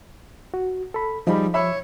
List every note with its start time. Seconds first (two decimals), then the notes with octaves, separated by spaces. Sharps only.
0.54 F#4
0.94 A4 B5
1.27 F3 G3 D#4 G#4 B5
1.54 C#5 E5 B5 E6